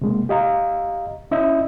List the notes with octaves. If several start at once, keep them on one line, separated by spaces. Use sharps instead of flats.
C3 G#3 A#3
G4 D#5 F5 A#5
C#4 E4 D#5 E5